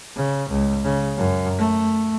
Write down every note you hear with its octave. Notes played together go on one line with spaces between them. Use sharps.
C#3
C#2
C#3
F#2
A3